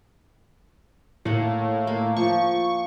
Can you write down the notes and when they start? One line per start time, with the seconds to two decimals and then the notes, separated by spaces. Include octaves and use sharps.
1.25 A2 A#3 F#5
1.87 A#3
2.17 F3 C#6